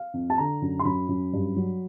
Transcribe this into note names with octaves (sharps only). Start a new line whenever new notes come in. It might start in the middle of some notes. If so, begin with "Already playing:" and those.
Already playing: F5
F2
A5
D3 A#5
F#2
C6
F#2 B5
F#2
G2
F#3